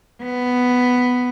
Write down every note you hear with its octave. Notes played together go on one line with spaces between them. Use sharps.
B3